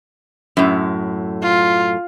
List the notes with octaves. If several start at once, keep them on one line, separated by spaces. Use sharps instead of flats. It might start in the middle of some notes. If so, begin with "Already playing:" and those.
F#2 A2
F4